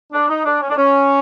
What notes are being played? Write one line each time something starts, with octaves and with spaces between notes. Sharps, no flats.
D4
D#4
D4
C#4
D4
C#4